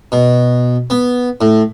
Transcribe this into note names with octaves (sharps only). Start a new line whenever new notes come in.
B2
B3
A2